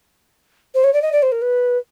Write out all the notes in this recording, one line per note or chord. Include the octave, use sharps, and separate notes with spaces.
C5
C#5
D5
D#5
D5
C5
A#4
B4